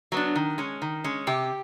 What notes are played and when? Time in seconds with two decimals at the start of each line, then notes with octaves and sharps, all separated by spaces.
0.12 F#3 B3 D4
0.35 D#3
0.58 G#3 C#4
0.82 D#3
1.04 G#3 C#4
1.27 C3 G4